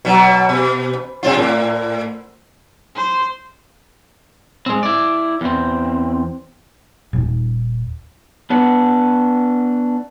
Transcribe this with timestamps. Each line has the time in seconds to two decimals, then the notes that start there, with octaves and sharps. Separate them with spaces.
0.05 B2 F#3
0.49 B2
1.23 C3 C4 F4
1.38 A2
2.96 C5
4.66 G#3 C4
4.83 E4 D5
5.41 E2 C4
7.13 D#1
8.50 B3 D4 B4 F#5